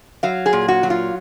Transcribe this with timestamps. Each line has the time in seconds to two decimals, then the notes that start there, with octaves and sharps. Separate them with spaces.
0.23 F#3 F5
0.46 G#4
0.53 A#2
0.68 F#4
0.83 F#3
0.90 F4